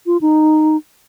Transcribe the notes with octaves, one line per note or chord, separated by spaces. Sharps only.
F4
D#4